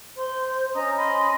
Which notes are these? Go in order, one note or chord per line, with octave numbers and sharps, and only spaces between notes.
C5 C6
C#4 D#5 A#5 D#6
D#5 B5 C6